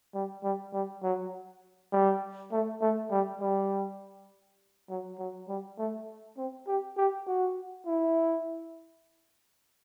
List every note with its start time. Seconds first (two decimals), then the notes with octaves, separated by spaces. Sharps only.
0.14 G3
0.43 G3
0.73 G3
1.03 F#3
1.92 G3
2.52 A3
2.82 A3
3.11 G3
3.40 G3
4.89 F#3
5.19 F#3
5.48 G3
5.78 A3
6.38 C4
6.67 G4
6.97 G4
7.27 F#4
7.87 E4